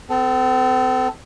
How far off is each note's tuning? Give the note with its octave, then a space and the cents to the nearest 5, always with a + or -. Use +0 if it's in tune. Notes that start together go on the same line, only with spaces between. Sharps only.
C4 -40 A4 +0